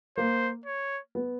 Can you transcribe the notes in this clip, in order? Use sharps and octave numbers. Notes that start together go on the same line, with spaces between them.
A#3 C5
C#5
B3